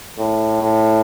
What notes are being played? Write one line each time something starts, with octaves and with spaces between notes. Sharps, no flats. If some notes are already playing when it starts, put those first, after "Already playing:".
A2
A2